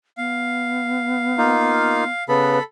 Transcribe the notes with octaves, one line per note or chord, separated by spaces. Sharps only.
B3 F5
A#3 D#4 F4
C#3 B3 A4 B4 B5